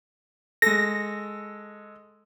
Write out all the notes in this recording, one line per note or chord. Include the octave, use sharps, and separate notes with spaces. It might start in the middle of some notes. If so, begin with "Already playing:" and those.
G#3 A4 A#6